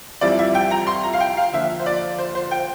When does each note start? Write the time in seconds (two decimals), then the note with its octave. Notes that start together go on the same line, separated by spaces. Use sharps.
0.21 F2 E3 G3 C4 E4 D5
0.39 E5
0.55 G5
0.71 A#5
0.87 C6
1.03 A#5
1.13 F5
1.20 G5
1.37 F5
1.53 D3 F3 A#3 E5
1.79 C5
1.86 D5
2.18 C5
2.35 C5
2.51 G5